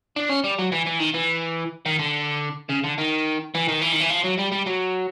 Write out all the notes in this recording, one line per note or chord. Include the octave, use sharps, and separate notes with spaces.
D4
C#4
G3
F#3
E3
E3
D#3
E3
D#3
D3
C#3
D3
D#3
E3
D#3
E3
D#3
E3
F3
F#3
G3
G3
F#3